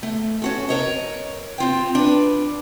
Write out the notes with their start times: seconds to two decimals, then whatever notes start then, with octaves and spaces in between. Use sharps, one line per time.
0.03 A3
0.42 C#4 F#4 A4
0.69 A#4 C#5 D#5
1.58 C4 F4 G5
1.95 D4 B4